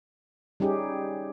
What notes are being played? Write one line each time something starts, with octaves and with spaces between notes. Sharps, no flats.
G3 C#4 D#4 G4 G#4